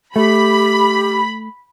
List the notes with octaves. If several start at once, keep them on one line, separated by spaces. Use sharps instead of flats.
A3 G4 B5